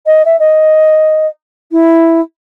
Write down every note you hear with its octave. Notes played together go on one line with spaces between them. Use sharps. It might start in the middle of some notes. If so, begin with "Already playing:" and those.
D#5
E5
D#5
E4